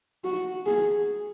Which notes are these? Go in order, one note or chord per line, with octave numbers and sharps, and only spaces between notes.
F#4
G#4